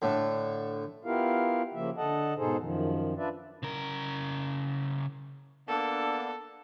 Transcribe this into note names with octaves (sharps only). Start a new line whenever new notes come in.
A2 D3
B3 E4 F4 G4 A#4 F5
C#3 F3 A#3 E5
D3 A4 D#5 F#5 A5
G#2 B2 D#4 G#4 A4 C5
F#2 D#3 F3
D4 F4 B4 D5 E5
C#3 A#4
A#3 B3 D4 A4